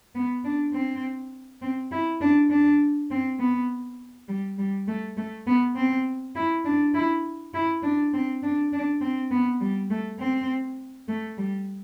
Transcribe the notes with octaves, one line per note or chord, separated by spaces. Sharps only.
B3
D4
C4
C4
E4
D4
D4
C4
B3
G3
G3
A3
A3
B3
C4
E4
D4
E4
E4
D4
C4
D4
D4
C4
B3
G3
A3
C4
A3
G3